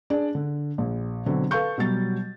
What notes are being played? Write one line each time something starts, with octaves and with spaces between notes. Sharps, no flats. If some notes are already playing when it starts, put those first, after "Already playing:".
D4 G#4 D5
D3
A#1
B2 D3 F#3 C4
A4 B4 F5 C#6 G6
B2 F#3 G3 A6